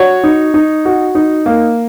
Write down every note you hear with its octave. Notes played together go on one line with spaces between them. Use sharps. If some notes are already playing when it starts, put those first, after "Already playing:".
Already playing: F#4 C#5
D#4
D#4
F#4
D#4
A#3